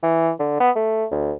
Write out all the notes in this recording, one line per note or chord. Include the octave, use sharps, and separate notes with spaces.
E3
D3
B3
A3
D2